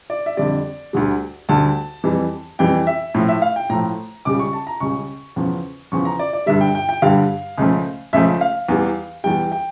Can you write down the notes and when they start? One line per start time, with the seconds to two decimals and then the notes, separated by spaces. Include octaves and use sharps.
0.10 D5
0.26 E5
0.37 F2 D3 G3 D5
0.93 D2 D3 G3
1.49 D2 D3 G3 A5
2.04 F2 E3 G3
2.59 F2 E3 G3 G5
2.87 E5
3.14 A2 F3 A3
3.28 E5
3.42 F5
3.56 G5
3.69 A2 F3 A3 A#5
4.25 C#2 C#3 G3 D6
4.39 C#6
4.53 A5
4.67 A#5
4.80 C#2 C#3 G3 C#6
5.36 E2 C#3 F3
5.92 E2 C#3 F3 C#6
6.05 A#5
6.19 D5
6.33 D5
6.46 G2 D3 G3 E5
6.61 G5
6.75 G5
6.89 G5
7.02 G2 D3 G3 F5
7.57 C#2 C#3 F3 A3
8.13 C#2 C#3 F3 A3 E5
8.41 F5
8.69 E2 E3 G3
9.24 E2 E3 G3 G5
9.52 G5